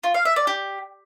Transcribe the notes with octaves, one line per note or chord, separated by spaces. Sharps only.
F4
F5
E5
D5
G4